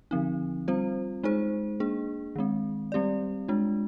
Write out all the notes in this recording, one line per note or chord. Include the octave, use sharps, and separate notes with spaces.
D3 F3 C4 D#4
G3 C4 F4 C5
G#3 D#4 G#4 C5
A#3 D4 G#4
D#3 G#3 C4
G3 C4 G4 D5
G#3 D4 F4